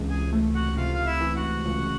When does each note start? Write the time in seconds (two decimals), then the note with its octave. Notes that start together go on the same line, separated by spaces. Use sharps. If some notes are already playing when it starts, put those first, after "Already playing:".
Already playing: C#2 C3 E3
0.10 G#4 G#5
0.33 A3
0.55 F#4 F#5
0.77 C3 F4 F5
0.95 F5
1.06 E4 E5
1.21 E3
1.36 F#4 F#5
1.65 C#2